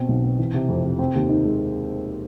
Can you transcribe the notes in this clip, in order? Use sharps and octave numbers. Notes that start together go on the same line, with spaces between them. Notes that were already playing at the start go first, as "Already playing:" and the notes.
Already playing: B2 C4
B1
C4
E3
C3
F2
C3
C4
D#2
D#3
G#3